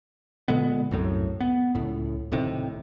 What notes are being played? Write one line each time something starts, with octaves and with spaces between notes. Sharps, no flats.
A#2 D3 G#3 B3
C2 F#2 A2
B3
C#2 A2
D1 A2 C3 D#3